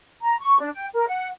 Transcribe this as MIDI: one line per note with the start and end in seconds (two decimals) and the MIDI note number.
0.22 0.39 82
0.40 0.59 85
0.60 0.69 62
0.74 0.86 79
0.94 1.05 70
1.07 1.27 78